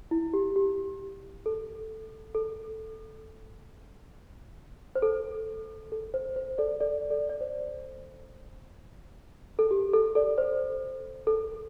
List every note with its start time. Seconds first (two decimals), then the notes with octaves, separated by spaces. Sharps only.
0.11 E4
0.34 G4
0.56 G4
1.46 A4
2.35 A4
4.95 C5
5.02 A4
5.92 A4
6.14 C5
6.36 C5
6.58 A4 D5
6.80 A4 D5
7.10 A4 D5
7.29 D5
7.41 C5
9.59 A4
9.71 G4
9.93 A4
10.15 A4 D5
10.38 C5
11.27 A4